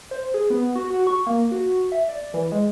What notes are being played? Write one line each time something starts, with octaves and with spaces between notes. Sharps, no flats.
C5
G#4
B3
F#4
F#4
C#6
A#3
F#4
E5
D5
E3
G#3